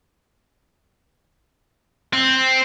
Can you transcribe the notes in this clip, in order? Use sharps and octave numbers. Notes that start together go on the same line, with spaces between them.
C4